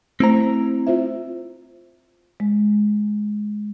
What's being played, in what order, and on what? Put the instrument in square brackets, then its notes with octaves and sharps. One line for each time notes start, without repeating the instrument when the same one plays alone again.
[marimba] A3 C5 [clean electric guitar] C4 E4 A#5
[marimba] F4 C5 E5
G#3